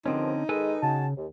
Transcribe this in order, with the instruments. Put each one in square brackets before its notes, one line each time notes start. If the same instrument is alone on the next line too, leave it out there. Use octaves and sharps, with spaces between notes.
[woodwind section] G2 D#3 F3 [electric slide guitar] D3 C4 C#4 [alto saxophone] D#4
[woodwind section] D#3 G#3 [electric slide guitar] A4 B4 G#5
[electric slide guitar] C#3 [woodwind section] F#4 G#5 A5
[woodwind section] D#2